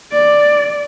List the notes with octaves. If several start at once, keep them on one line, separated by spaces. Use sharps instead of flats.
D5